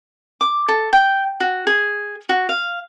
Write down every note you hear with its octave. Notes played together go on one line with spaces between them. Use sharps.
D6
A4
G5
F#4
G#4
F#4
F5